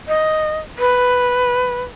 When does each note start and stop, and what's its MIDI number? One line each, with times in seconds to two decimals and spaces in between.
0.08 0.59 75
0.79 1.82 71